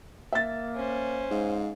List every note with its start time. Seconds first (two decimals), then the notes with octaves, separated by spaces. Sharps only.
0.32 A#3 E5 A6
0.75 C#4 C5
1.31 G#2 F5